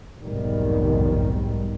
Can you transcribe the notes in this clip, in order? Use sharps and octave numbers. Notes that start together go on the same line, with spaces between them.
F1 B1 G#2 D#3 G3